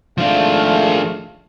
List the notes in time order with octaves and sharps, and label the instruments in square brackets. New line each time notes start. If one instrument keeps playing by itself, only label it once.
[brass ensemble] G#1 A3 [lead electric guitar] F3 D4 [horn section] F5